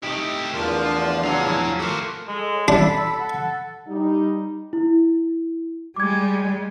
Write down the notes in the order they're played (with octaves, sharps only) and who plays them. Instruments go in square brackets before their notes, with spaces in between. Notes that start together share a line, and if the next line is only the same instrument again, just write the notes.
[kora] C3 A3 [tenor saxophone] D#4 [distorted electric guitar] E4 G4
[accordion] E2 D4 F4 [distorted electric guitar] F3 [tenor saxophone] A#4
[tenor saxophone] F#3 [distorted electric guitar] G#4 F5 [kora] A4
[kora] F3 E4
[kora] A3 A#4 [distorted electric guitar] F#4 C5 [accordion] D6
[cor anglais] G#3 [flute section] A4 D#5
[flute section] C#5
[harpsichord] D4 [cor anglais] A4 [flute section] B5 E6
[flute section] F#5
[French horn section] G3 D#4
[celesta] E4
[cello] G3 G#3 [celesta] D6 G#6